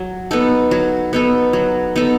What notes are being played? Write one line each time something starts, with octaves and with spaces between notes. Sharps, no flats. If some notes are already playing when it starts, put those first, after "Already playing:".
Already playing: F#3
B3 D#4 A4
F#3
B3 D#4 A4
F#3
B3 D#4 A4